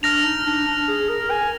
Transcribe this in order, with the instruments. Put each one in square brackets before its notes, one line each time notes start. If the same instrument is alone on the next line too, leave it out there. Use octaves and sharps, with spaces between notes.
[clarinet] D4 [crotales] F6 A#6 F7
[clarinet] D#4
D4
D4
G#4
A#4
G#5